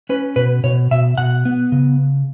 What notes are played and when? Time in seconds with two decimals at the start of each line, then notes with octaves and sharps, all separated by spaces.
0.09 C#4 B4
0.36 B2 B4
0.64 B2 C#5
0.91 B2 E5
1.18 B2 F#5
1.45 B3
1.72 C#3